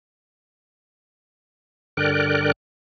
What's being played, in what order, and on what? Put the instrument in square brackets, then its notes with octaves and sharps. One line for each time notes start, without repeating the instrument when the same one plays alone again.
[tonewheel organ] G2 D3 A#4 D5 G5 F#6